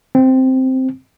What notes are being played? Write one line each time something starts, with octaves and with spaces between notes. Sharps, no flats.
C4